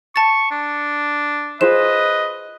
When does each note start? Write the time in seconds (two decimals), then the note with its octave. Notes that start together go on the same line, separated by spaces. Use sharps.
0.16 A5 C#6 A6
0.51 D4
1.61 F4 G#4 B4 C5 D#5 E7